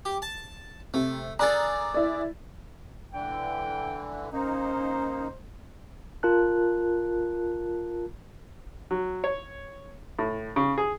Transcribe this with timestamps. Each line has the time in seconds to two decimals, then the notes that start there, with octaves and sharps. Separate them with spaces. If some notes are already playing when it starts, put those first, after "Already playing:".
0.05 G4
0.22 A5
0.94 C3 A3
1.39 D4 G#4 A4 A#5 A6
1.94 E4 D5
3.13 E1 D3 E3 G5
4.32 A#3 C#4 D#4 C5
6.23 F4 A#4 A5 F#6
8.91 F#3
9.24 C#5
10.19 A2
10.56 C#3
10.78 G#4